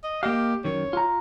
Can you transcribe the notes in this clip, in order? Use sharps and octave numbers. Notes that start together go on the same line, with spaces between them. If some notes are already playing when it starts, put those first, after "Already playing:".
D#5
A#3 G4 D#5 F5
F#2 D#3 C#5
F4 A#5